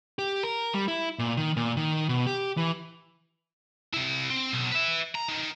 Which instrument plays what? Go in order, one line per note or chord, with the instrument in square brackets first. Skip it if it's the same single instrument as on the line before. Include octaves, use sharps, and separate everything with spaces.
[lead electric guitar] G4
A#4
G3
E4
A#2
D#3
A#2
D#3
B2
G4
E3
[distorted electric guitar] C3 E4
C4
B1
B4 E5
A#5
D#3